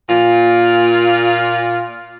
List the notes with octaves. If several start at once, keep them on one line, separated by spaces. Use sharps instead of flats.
A#2 F4